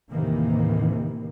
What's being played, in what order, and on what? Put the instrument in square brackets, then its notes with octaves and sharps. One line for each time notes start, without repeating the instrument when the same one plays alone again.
[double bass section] D#2 A2 C3 D#3 E3 A#3